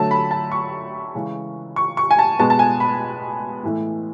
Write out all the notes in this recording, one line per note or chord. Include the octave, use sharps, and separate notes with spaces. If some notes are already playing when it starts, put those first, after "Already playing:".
Already playing: D3 F#3 A3 A5
B5
A5
C#6
C#3 E3 G#3
C#6
C#6
G#5
A5
B2 G#3 B3 A5
A5
G#5
B5
A2 E3 A3